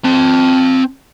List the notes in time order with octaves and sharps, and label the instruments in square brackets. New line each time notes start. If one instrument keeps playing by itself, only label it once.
[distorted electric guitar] C4 A5